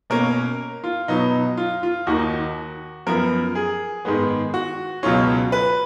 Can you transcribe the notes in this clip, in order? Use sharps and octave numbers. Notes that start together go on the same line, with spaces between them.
B2 A#3 C#4 A#4
F4
B2 F#3 B3 D#4
F4
F4
D#2 D#3 A#3 D#4 F#4
F#2 F3 B3 A#4
G#4
G#2 D#3 G#3 B3
F#4
C#2 B2 F#3 C#4 F4
B4